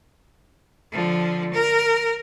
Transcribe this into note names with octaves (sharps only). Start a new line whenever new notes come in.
D3 F3
A#4